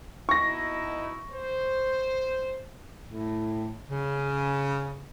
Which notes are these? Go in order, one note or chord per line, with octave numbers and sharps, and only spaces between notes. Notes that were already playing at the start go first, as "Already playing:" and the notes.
B2 D#4 E4 C#6 A#6
C5
A2
C#3